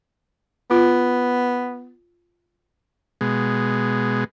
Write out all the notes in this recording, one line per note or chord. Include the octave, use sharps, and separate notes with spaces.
B3 F4
B2 G#3